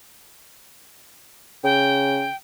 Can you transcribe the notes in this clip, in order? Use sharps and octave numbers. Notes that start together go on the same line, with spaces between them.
C#3 G5